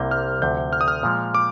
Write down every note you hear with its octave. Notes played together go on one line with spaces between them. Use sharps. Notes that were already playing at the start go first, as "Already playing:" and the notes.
Already playing: C2 C3 G3 A#3 G6
F6
D2 C3 F3 G6
F6
D#6
F6
A#2 F3 G#3
D6